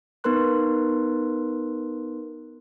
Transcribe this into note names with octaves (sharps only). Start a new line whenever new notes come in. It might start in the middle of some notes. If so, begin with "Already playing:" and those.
B3 D#4 A#4 B4 C6 F#6